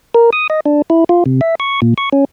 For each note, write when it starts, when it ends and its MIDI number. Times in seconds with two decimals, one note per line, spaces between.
0.14 0.30 70
0.33 0.47 87
0.50 0.60 75
0.66 0.82 62
0.90 1.04 64
1.09 1.24 65
1.26 1.41 48
1.41 1.55 76
1.60 1.80 85
1.82 1.94 46
1.98 2.09 85
2.13 2.25 61